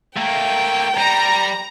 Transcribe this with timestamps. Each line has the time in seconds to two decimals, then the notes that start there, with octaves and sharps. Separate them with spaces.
0.16 A3 A#3 G5
0.97 G3 A#5